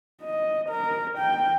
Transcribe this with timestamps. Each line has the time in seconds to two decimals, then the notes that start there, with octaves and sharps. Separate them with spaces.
0.22 D#5
0.69 A#4
1.18 G5